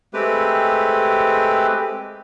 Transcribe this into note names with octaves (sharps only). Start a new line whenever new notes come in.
G#3 A3 C4 G4 B4